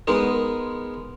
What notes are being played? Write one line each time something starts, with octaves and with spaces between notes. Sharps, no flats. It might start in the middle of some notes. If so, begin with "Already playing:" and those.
G#3 B3 D#4 A#4 D#5